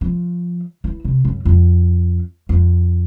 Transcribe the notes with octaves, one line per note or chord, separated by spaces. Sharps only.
F3
E3
C3
F#2
F2
F2